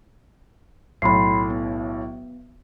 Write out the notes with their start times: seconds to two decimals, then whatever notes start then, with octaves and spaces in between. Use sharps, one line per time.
1.02 B1 A2 B5 C6 C7
1.50 B3